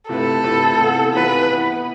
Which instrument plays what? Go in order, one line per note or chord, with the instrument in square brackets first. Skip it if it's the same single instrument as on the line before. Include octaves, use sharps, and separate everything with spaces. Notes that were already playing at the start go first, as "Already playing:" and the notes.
[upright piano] C3 F3 A3 E4 B4 [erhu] A4
[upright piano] C3 F3 A3 E4 B4
C3 E3 B3 F4 G#4
[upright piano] C3 E3 B3 F4 G#4 [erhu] B4
[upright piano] B3 E4 B4